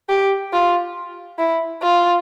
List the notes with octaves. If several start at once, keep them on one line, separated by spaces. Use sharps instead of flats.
G4
F4
E4
F4